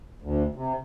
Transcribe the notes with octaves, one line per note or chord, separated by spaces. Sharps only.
D2
C3